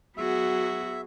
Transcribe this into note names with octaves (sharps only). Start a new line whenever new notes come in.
F#3 B3 F#4 G#4 E5